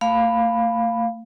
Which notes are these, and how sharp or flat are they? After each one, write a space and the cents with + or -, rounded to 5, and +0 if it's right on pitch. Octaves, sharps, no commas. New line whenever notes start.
A3 +40 F5 +0 B5 +0